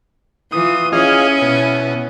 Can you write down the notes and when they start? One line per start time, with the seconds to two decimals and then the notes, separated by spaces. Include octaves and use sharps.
0.52 E3 F4 D#6
0.93 C#4 E4 G#4 D#5 F5
1.42 B2